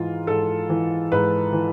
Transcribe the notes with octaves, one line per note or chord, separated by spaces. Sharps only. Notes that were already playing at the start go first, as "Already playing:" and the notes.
Already playing: G#2 E3 F4
G#2 A4
E3
G#2 B4
E3